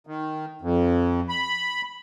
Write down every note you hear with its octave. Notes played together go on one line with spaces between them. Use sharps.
D#3
F2
B5